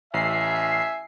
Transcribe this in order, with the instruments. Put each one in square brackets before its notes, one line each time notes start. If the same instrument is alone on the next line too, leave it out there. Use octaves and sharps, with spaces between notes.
[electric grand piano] A1 [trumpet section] E5 G#5 [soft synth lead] C7